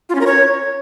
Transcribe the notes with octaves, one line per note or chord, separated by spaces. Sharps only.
F4
C#4
A#4
C#5